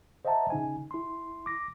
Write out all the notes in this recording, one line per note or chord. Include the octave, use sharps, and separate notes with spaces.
C5 D#5 E5 F#5 A5 A#5
C#3 D#4 G#5
E4 C6
D6 A#6